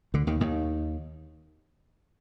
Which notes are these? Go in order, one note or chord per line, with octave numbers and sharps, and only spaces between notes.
D2 D3
D#2 D#3
D#2 D#3